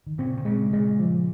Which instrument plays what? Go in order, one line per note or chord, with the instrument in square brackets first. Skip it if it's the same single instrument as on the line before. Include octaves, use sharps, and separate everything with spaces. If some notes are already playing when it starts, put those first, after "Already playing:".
[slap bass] D#3
[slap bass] A#2 C#3 [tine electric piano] C4
[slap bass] D#3
[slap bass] A#2 C#3 [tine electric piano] G#3
[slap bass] A#2 C#3 [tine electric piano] G#3
[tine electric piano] F3